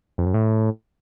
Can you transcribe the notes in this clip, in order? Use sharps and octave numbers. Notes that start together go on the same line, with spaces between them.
F2
F#2
A2